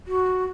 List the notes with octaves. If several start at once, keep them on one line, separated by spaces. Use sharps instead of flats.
F#4